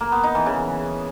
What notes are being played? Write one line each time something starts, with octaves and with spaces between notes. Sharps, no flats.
A#3
B3
D#4
E3
C#3